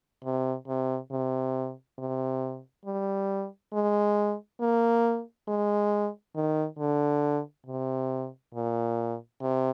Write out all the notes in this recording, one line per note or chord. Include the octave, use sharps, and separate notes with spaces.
C3
C3
C3
C3
G3
G#3
A#3
G#3
D#3
D3
C3
A#2
C3